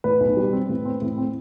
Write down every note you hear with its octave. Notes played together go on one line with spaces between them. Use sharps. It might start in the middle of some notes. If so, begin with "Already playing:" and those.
A2 B4
B1
G3
C4
A2
C4
A2
C4